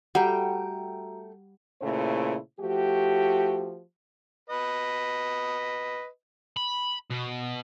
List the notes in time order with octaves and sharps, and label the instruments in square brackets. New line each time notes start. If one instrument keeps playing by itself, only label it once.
[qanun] G3 [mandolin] A3 G5 [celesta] F#4 A#5 [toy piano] F#5
[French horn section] A#2 C#3 A3 E4 C5
F3 A3 F#4 G4
[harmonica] B4 D#5
[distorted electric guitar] B5
B2